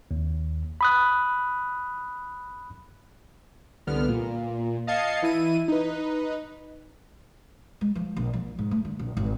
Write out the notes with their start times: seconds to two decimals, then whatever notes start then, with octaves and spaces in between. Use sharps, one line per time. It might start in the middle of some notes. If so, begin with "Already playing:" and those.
0.11 D#2
0.81 B5 D#6 F#6
3.87 C2 D3 B3 F6
4.08 A#2
4.87 D#5 F5 A5 G#6 C7 C#7
5.22 E3 E4 D#7
5.68 D#4 B4
7.81 G#3
7.95 F3
8.17 A#1
8.33 F3
8.59 G#2
8.71 A3
8.85 D3
8.99 A#1
9.17 G#1